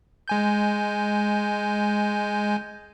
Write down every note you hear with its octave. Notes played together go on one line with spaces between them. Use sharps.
G#3 G#5 G6